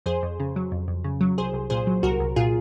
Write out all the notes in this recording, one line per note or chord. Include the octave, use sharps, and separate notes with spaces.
F2 G#4 C5
F2
C#3
F#3
F2
F2
C#3
F#3
C2 G#4 C5
C2
A#2 G#4 C5
F#3
C2 F#4 A#4
C2
A#2 F4 G#4